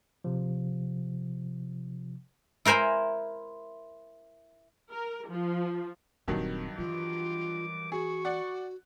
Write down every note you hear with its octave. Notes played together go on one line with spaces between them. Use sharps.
C3 F3
E4 A#4 C5 G#5 B5
A#4
F3
D#1 G2 D#3 F#3 C4
E3 F4 D6
F#4 G#4 C#6
D5 F#5